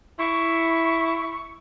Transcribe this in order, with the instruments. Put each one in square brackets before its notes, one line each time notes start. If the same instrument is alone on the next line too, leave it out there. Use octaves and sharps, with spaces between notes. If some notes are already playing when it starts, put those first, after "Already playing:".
[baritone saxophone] E4 [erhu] C#6